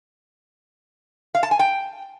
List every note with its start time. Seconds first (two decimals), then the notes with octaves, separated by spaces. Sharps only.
1.35 F5
1.43 A5
1.51 G#5
1.59 G5